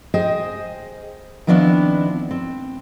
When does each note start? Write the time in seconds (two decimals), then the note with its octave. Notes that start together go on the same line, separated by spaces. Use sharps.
0.14 G#4 C5 D#5 G5
1.47 D#3 F3 B3 C4 D4 E4
2.31 C4